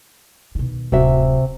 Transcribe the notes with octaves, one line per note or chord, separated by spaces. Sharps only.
B2 D#3
D1 C3 F#3 F#4 E5